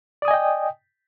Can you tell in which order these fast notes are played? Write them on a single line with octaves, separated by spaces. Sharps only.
D5 D#6 G#5 D#5 G5